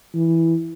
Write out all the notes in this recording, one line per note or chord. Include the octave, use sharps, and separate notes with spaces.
E3